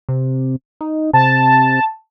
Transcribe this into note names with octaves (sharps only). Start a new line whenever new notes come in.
C3
D#4
C3 A5